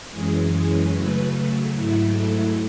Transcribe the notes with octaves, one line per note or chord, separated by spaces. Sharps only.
F#2 E3 G#3 C#4 G#4
G#4
C#3 F#3 A3 B4
G#2 F#3 A3 E4
A4